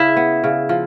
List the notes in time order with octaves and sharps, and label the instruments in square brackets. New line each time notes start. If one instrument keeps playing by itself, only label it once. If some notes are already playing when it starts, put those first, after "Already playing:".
Already playing: [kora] C#3 [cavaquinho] E4
[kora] B3
C#3
F3